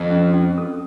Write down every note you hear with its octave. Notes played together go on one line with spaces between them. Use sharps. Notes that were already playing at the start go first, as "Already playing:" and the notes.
Already playing: F2
C#4
C#4
A4